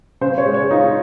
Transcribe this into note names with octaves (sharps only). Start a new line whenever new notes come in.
C#3 C5
C#5
G#3
C#5
D#4 F4